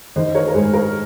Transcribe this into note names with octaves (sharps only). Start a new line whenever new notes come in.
D#3 C5 D#5
A#4 C#5
A#4
G#2 G#4 C5
A#4